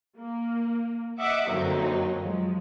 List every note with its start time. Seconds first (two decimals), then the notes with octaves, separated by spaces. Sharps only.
0.18 A#3
1.19 D#5 E5 F#5 D6
1.49 F#2 D3 F#3 A#3 C4 D#4
2.21 F3 F#3 G#3